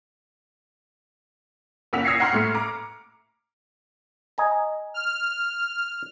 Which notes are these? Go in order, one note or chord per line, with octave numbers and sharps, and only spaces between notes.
F#1 A#3 F#5 E6 B6 F7
D#6 E6 G#6 A#6 C7 C#7
F#5 G5 A#5 C6 C#6 F6
A2 A3 C#7
A#5 D6
D#5 G#5 A#5
F6